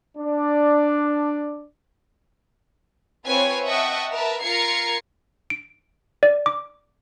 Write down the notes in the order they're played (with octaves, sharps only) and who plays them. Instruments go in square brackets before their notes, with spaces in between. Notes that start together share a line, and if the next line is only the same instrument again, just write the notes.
[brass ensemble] D4 D5
[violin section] C4 F4 B4 C#5 G#5
D#5 E5 F#5 G5 A5 C#6
A#4 B4 E5 A5
F4 A#4 A#5 G#6 C7 C#7
[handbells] D7
D5
D6